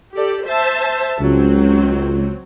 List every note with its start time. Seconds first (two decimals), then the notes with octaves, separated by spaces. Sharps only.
0.14 G4 A4 D5
0.45 C5 E5 A5
1.20 C#2 F#3 C4